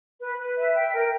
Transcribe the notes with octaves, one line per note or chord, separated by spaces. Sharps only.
B4
B4
E5
G5
A#4